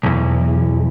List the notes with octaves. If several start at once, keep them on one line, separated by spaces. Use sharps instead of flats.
B1 E2